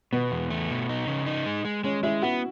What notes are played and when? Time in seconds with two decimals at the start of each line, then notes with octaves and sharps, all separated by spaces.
0.12 B2 B3
0.32 E2
0.50 A3
0.70 B2
0.89 D#4
1.07 C#3
1.26 D#4
1.46 G#3
1.65 G#3
1.84 G#3 C#4
2.03 G#3 E4
2.22 B3 F#4